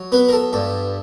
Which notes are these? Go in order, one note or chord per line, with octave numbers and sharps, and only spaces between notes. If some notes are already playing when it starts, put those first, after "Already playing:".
Already playing: F#3
B3 B4
A#4
A4
G2 A4